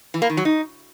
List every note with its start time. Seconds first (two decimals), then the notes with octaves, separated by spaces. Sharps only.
0.14 E3
0.22 A#3
0.30 D#3
0.37 F#3
0.45 D#4